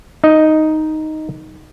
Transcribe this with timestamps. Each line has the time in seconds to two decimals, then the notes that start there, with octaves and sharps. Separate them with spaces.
0.24 D#4 D#5